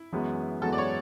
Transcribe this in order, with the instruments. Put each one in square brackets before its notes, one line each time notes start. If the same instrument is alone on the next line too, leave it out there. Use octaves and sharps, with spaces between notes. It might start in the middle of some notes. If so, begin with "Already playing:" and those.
Already playing: [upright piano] E4
[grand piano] F#2 E3 G#3 B3 F#4
[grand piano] F#2 E3 G#3 B3 F#4 [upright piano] A4
[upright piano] D5
C#5